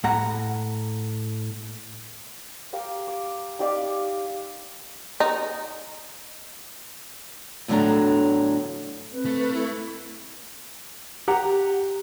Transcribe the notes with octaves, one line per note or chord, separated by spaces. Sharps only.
A2 F#5 A#5
G4 F5 A#5 D6
D6
D#4 G4 D5 F5
D#4
E2 A2 D3 F#3 D4 A#5
C4 B4
A3
B4
E4
G4 F#5 A#5